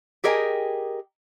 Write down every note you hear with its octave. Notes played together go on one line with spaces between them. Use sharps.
G4 G#4 A#4 D#5 G5 G#5